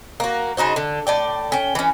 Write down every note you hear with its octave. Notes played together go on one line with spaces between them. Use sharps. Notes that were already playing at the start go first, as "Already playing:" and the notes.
A#3 F#4
C#3 D#4 F#4 C5
D3
A2 D5 G5
C#4 G5
E3 C#4